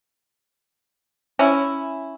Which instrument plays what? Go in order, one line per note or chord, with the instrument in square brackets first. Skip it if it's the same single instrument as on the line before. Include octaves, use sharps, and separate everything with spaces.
[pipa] C#4 E4